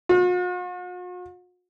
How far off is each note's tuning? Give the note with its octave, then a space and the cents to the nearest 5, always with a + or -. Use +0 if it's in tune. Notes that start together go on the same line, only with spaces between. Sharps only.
F#4 -45